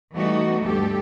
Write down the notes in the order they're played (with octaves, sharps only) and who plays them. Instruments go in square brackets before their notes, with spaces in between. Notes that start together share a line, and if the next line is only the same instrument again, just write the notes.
[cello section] E3 G3 A3 B3 D#4 F#4
D2 G2 G4 A4